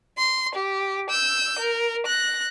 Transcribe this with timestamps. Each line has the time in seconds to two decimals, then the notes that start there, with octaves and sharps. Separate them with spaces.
0.18 C6
0.55 G4
1.10 E6 G6
1.59 A#4
2.06 F#6 A#6